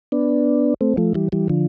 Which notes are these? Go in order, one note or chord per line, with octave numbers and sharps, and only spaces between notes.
B3 D4
A3 C4
F3 A3
E3 G3
E3 G3
D3 F3